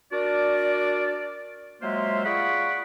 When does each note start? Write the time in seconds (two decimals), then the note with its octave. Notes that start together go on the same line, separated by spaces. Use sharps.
0.12 D4 F#4 A#4 D5
1.82 F#3 G#3 A#3 F4 C5 E5
2.25 F4 G#4 D5 F#5 B5 C#6